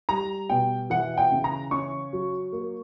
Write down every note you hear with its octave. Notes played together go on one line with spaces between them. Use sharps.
G3 A#5
B2 G5
E3 F#5
G5
C#3
A#5
C#4 C#6
F#3
A#3